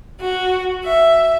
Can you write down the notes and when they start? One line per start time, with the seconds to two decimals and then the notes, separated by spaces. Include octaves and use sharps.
0.20 F#4
0.83 E5